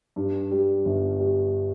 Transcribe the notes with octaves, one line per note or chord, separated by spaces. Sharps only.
G2
G3
G1
G3